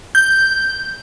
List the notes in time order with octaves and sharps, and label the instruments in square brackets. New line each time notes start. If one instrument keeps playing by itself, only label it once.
[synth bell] G6